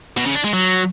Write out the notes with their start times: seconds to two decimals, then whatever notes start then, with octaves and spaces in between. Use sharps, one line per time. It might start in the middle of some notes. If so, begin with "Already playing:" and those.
0.17 B2
0.26 C#3
0.35 D4
0.44 G#3
0.53 F#3